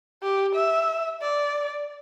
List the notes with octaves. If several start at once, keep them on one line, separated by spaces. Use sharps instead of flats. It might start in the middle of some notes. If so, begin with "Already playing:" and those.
G4
E5
D5